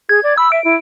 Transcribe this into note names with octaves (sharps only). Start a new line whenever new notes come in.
G#4 G#6
D5
B5 E6
E5 D7
E4